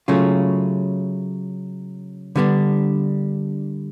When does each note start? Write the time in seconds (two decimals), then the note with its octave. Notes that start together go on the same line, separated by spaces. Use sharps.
0.08 C#3 F#3 A3 C#4 F4
2.36 D3 G3 B3 D4